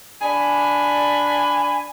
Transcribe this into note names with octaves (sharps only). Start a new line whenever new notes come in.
D4 G#5 B5